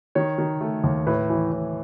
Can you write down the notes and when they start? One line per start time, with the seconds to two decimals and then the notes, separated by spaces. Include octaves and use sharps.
0.15 D#3 C#5
0.38 D#3
0.61 A3
0.84 D#2
1.07 A2 B4
1.30 E3
1.52 A2